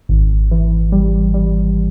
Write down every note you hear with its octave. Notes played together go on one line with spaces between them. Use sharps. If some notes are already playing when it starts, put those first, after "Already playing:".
G#1
E3
G3
G3